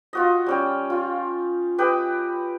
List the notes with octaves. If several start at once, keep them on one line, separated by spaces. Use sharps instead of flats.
F4 F#4 D#5
G3 C#4 G5
F4
G4 B4 D#5 G5